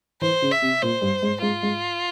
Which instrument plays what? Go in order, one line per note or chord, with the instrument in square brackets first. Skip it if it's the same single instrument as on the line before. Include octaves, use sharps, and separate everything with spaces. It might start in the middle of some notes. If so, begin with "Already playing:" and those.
[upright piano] E3 [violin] C5
[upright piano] C#3
[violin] E5
[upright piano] C3
[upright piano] A#2 [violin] C5
[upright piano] G2
G#2
[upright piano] G#2 [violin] F4
[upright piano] G#2